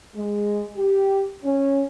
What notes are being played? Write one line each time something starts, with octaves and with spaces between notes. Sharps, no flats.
G#3
G4
C#4